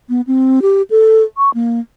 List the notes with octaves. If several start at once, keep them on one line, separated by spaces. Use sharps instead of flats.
B3
C4
G4
A4
C#6
A#3